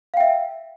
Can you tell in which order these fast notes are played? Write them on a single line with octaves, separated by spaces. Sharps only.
F5 G5 E5